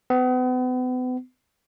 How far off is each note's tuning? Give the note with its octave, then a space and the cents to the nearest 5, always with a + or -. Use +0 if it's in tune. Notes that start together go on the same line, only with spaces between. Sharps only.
B3 +40